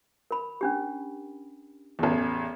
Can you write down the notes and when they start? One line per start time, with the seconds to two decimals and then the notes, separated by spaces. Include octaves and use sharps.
0.31 A#4 B5
0.61 C#4 D4 G4
1.99 A1 E2